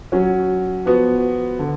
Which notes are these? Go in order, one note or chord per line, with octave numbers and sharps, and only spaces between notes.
F#3 C#4 F#4
F3 B3 F#4
D3